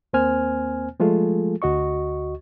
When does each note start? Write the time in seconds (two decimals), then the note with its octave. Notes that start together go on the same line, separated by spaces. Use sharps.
0.13 D#2 A#3 C4 C5 G#5 F6
1.00 F3 G#3 A3 F4 G#4 A4
1.62 D2 F#4 D#5 C#6